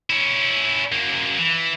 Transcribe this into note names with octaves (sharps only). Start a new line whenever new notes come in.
C#4 E4
F#2 A#3
E3